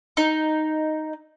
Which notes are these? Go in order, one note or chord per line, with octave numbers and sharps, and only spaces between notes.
D#4